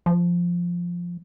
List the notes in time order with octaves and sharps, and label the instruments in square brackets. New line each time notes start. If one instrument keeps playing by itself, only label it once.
[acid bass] F3